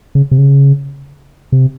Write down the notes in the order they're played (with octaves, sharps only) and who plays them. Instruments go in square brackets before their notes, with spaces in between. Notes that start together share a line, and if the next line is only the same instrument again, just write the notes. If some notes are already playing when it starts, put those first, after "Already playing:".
[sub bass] C#3
C3
C#3
C3